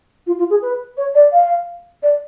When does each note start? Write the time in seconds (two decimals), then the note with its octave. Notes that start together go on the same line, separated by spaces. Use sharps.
0.27 F4
0.39 F4
0.50 G#4
0.62 B4
0.97 C#5
1.15 D5
1.33 F5
2.03 D5